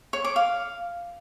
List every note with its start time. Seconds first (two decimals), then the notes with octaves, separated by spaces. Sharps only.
0.13 C#5
0.25 D6
0.36 F5